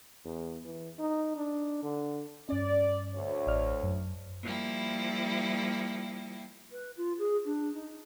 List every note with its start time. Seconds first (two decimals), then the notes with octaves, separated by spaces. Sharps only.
0.25 E2
0.65 E3
0.99 D#4
1.36 D4
1.83 D3
2.49 G2 C#4 D5
3.15 D2 C#5
3.47 A1 D5 F6
3.83 F#2
4.44 F3 G3 A#3 E4 G5
6.72 B4
6.97 F4
7.19 G#4
7.45 D4
7.74 D#4